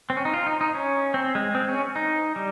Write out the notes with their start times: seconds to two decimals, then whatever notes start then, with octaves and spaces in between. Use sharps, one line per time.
0.10 C4
0.17 C#4
0.25 D#4
0.34 F4
0.47 D#4
0.61 D#4
0.75 C#4
1.14 C4
1.35 G#3
1.55 C4
1.69 C#4
1.96 D#4
2.36 G3